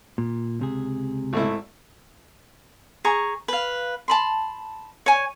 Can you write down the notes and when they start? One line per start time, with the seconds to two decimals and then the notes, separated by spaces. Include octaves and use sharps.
0.18 A#2
0.59 C#2 C3 G#4
1.33 G#1 A3 E4
3.05 G#4 A#5 C#6
3.48 B4 F5
4.08 A5 B5 C6
5.06 C#5 G#5